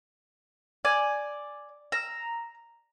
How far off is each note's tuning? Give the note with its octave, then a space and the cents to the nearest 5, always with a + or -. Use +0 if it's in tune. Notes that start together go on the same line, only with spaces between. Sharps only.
D5 +0 G#5 +0
A#5 +0 E6 +0